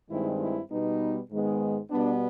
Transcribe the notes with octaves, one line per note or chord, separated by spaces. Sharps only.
G2 D#3 G#3 C4 E4
E4
B2 G3 B3 D#4
G#2 D#3 G#3 B3
B2 G3 B3 D4